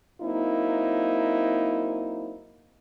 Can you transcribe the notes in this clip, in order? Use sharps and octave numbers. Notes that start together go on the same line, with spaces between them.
F#3 A#3 C4 D#4 E4